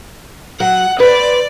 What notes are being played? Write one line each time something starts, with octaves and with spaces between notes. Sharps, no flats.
F#3 F#5
B4 C5 D5